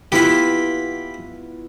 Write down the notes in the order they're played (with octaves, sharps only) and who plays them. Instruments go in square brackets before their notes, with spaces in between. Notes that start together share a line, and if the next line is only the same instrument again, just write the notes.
[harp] B3 E4 F4 [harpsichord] G4 B5